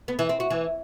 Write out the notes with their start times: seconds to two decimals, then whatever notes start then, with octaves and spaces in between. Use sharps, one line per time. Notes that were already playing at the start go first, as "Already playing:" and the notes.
0.08 B3
0.19 E3
0.29 C4
0.40 F#4
0.50 E3